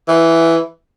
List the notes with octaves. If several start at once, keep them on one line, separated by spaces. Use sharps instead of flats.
E3